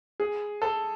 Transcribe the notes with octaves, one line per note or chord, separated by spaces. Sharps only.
G#4
A4